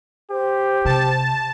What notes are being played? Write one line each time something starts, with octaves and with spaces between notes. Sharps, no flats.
G4 C5
C3 A5